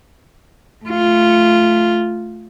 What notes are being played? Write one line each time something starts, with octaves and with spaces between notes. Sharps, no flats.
A3 F4